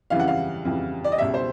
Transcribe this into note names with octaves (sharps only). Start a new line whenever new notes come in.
F2 C#3 E3 G3 F5
F#5
F5
F2 C#3 E3 G3
D5
D#5
C#2 B2 G3 E5
C5